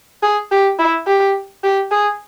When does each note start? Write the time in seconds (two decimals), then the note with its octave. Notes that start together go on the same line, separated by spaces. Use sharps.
0.23 G#4
0.52 G4
0.79 E4
1.07 G4
1.64 G4
1.92 G#4